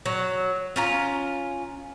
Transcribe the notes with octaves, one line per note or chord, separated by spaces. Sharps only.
F#3
C#4 F4 A#5